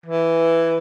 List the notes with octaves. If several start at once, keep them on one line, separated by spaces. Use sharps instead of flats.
E3